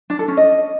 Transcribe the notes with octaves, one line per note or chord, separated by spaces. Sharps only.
D4
A4
C#4
D#5